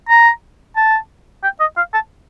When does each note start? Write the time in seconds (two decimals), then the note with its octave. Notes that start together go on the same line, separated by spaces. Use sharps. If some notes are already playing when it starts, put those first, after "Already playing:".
0.09 A#5
0.76 A5
1.43 G5
1.60 D#5
1.77 F5
1.94 A5